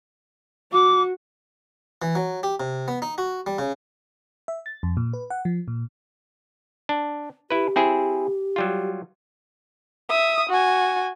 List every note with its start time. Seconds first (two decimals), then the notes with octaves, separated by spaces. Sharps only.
0.73 F#4 D6
2.02 E3
2.15 F#3
2.43 G4
2.60 C3
2.88 B3
3.02 D#4
3.18 F#4
3.47 G3
3.59 C#3
4.48 E5
4.66 A6
4.83 F2
4.97 A#2
5.13 B4
5.30 F#5
5.45 F3
5.68 A#2
6.89 D4
7.50 E4 G4 B4
7.76 C4 E4 G#4
8.56 F#3 G3 F4
10.09 E5 D#6
10.49 F#4 G#5